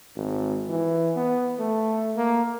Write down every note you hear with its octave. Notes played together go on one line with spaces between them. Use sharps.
G#1
E3
B3
A3
A#3